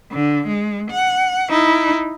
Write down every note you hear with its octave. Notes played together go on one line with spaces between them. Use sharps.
D3
G#3
F#5
D#4 E4